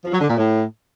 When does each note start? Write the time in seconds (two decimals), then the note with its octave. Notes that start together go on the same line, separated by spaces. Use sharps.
0.04 F3
0.12 F#3
0.20 D3
0.28 A#2
0.36 A2